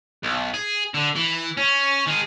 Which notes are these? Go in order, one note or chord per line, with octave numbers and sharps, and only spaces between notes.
B1
G#4
D3
E3
C#4
D#3 G#4